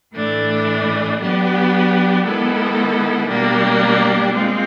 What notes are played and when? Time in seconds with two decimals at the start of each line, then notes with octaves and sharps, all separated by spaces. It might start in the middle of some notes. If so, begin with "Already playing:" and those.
0.13 A2 E3 A3 D4
1.19 F#3 B3 D4 G4
2.24 D#3 G#3 B3 E4 A4
3.28 B2 G3 A#3 D4 G4
4.34 G#3 C4 F4